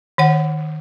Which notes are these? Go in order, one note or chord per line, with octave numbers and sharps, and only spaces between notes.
D#3 C#5 F#5